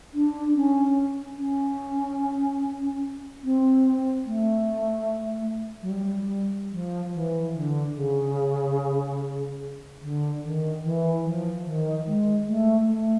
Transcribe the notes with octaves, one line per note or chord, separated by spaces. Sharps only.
D4
C#4
C#4
C4
A3
F#3
G3
F3
E3
D3
C#3
D3
D#3
E3
F3
D#3
G#3
A3
A3